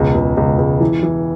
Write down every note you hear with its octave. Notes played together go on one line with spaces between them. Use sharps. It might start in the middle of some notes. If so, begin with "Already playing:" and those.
Already playing: E1 C#2
C#2
C#2
C#2
E3
E3